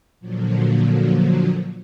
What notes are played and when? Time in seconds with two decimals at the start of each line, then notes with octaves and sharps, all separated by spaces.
0.20 A#2 D3 F3 F#3